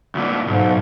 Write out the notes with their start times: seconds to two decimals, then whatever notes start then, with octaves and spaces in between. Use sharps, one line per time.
0.15 D2 A#2
0.47 B1 G#2